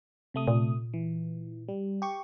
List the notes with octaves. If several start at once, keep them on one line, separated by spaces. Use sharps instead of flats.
C3 A3 D#6
A#2
E3
G3
G4 C#6